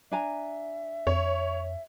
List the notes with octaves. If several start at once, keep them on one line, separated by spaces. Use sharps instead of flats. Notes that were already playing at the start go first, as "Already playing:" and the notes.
D4 E5 G#5 A#5
F2 C#5